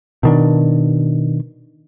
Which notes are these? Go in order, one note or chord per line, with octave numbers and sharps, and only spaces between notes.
B2 D#3 D4